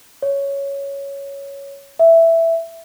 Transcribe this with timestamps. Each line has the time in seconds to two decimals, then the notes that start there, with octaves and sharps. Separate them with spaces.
0.22 C#5
1.99 E5